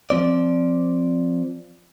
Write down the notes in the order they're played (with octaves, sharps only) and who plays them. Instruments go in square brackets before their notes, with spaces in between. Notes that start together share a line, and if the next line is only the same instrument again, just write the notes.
[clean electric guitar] F3 C4 D5